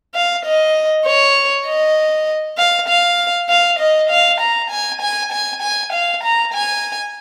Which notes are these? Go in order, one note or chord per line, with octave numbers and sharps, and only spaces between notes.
F5
D#5
C#5
D#5
F5
F5
F5
D#5
F5
A#5
G#5
G#5
G#5
G#5
F5
A#5
G#5